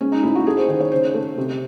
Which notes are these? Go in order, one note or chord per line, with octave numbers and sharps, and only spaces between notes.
G#3 C#4
D#4
A2 E4
F#4
A3 G#4
C5
D#3 C5
C#5
C#3 C5
A3
C3